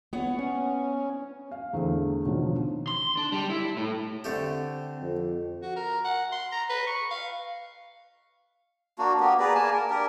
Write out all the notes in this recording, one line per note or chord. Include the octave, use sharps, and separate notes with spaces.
B3 C#5 F#5
C#4
F5
E2 D3 E3 A3 C4
B2 D3 D#3 F3 C#4
C6
D4
G3
E4
A2
D3 A3 C4 G4
F2
F#4
A#4
F#5
C6
A#5
B4
C#6
F5
A#3 D4 F#4
A#3 B3 G4
G#4 B4 D5 A#5
A#3 G#5 A5
A#4
D4 G4 A#4